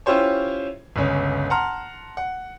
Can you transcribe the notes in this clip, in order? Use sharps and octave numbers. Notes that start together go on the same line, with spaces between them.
C#4 E4 F4 G4 C5 C#5
G1 C#2 C#4
F#5 A5 A#5 C6 F6
F#5